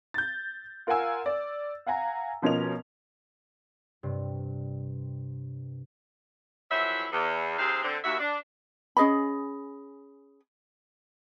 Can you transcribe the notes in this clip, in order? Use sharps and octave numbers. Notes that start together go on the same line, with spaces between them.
G6 A6
F4 A#4 F5 F#5 G#5 E6
D5
F5 F#5 G#5 A#5
B2 F3 C#4 A#4 D#5 F7
G2 C3
F2 E3 F#3 E4 C5 E5
E2
D#2 C3 C4 G#4 C5 F5
D3 C4
D#2 F#4 E5
D4
C#4 G#4 D#5 B5